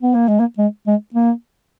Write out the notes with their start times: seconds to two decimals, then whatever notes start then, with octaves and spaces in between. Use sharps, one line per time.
0.02 B3
0.14 A#3
0.28 G#3
0.40 A#3
0.58 G#3
0.87 G#3
1.14 A#3